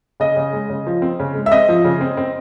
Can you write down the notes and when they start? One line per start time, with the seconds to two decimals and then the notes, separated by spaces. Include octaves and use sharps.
0.20 C#3 D#5
0.36 C#3
0.53 G#3
0.70 C#3
0.87 F3
1.02 C4
1.20 C#3
1.35 G#3
1.46 E5
1.52 C4 D#5
1.69 F3
1.85 C#3
2.01 C4
2.17 C4